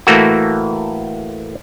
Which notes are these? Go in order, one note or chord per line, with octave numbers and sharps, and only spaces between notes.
A2 E3 A3 A#3 F#4